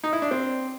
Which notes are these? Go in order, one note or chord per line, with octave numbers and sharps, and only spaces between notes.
D#4
E4
D4
C4